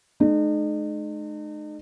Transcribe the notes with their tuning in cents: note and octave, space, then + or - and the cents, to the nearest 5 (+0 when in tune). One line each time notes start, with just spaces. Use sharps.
G#3 +45 D#4 -40